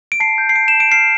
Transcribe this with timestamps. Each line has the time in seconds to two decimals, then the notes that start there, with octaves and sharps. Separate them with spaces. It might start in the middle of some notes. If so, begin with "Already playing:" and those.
0.12 D7
0.20 A5 C7
0.38 G6
0.49 C7
0.56 A5 D7
0.68 E7
0.74 A5
0.80 D7
0.91 F6 C7